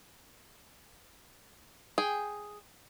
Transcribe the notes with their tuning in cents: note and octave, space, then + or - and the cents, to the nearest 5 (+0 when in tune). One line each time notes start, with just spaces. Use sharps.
G#4 +0 G5 +0